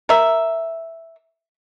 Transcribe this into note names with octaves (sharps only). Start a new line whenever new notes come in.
A#4 E5